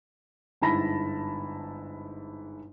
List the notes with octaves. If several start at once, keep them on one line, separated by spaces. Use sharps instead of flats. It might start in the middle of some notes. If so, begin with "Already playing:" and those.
G1 G#2 E4 A5 B5 A#6